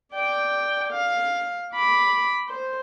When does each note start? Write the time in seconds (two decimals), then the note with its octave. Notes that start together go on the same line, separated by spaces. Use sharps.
0.14 D5 G5
0.93 F5
1.73 B5 D6
2.48 C5